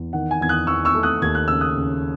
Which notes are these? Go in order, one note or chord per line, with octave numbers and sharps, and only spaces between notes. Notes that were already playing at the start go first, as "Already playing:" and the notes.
Already playing: E2
D#3 F#5
G#5
E2 G#6
D#6 F#6
E2 C#6 E6
C#6 E6
A3
D#6 F#6
D#2 G#6
F#6
C#3 E6
D#6 F#6
C#3